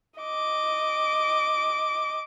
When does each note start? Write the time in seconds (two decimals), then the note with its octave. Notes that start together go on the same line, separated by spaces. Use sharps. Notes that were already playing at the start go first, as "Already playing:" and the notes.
0.20 D#5 D6